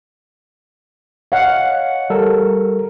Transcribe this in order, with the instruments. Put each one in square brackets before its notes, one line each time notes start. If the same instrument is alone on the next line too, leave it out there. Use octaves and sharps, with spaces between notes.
[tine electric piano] C#5 D#5 [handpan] F5 F#5
[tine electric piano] G3 A4 A#4